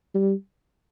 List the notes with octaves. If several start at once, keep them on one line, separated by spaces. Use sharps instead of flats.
G3